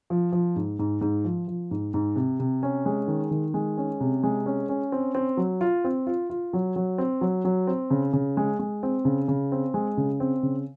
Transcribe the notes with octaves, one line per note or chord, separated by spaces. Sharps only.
F3
F3
G#2
G#2
G#2
F3
F3
G#2
G#2
C3
C3
C#4
G#3
D#3
D#3
G#3
C#4
C3
G#3
C#4
C#4
C4
C4
F#3
F4
C4
F4
F4
F#3
F#3
C4
F#3
F#3
C4
C#3
C#3
G#3
G#3
C4
C#3
C#3
C4
G#3
C#3
C4
C#3